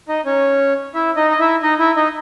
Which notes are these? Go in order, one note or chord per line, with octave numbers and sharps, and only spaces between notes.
D#4 D#5
C#4 C#5
E4 E5
D#4 D#5
D#5
E4 E5
D#4 D#5
E4 E5
D#4 D#5